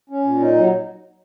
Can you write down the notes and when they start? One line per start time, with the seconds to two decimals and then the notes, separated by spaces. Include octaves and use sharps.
0.10 C#4
0.24 A#2
0.40 D#4
0.56 F#3